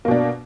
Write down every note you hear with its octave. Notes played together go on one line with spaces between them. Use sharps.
B2 A#3 D4